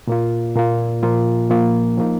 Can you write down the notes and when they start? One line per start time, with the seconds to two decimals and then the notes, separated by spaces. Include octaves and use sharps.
0.07 A#2 A#3 F4
0.55 A#2 A#3 F4
1.03 A#2 F3 A#3 F4
1.50 A#2 F3 A#3 F4
1.98 F3 A#3 D#4